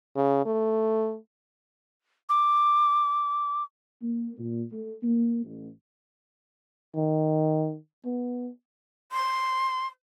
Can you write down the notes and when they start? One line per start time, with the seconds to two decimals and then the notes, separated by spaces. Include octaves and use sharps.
0.16 C#3
0.46 A3
2.29 D6
4.01 A#3
4.38 A#2
4.71 A3
5.03 A#3
5.44 A1
6.96 D#3
8.05 B3
9.12 C6